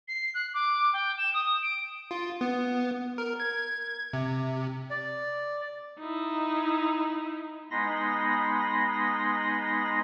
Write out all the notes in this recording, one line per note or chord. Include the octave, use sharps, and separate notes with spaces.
C7
F#6
D6
G5
E7
D#6
D7
F4
B3
A#4
G#6
C3
D5
D#4 E4
G#3 B3 D#4 B5 C6 A#6